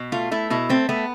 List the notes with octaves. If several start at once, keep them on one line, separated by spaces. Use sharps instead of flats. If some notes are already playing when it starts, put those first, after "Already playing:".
Already playing: B2
A3 F4
A3 E4
B2 E4
A3 C4
A3 B3